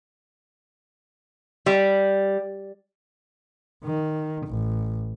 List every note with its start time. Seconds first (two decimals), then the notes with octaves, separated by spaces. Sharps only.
1.66 G3
3.85 D#3
4.47 A1